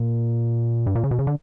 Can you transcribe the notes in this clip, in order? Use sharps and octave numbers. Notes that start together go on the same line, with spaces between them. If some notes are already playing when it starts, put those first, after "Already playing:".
Already playing: A#2
G2
A#2
C#3
B2
C#3
D3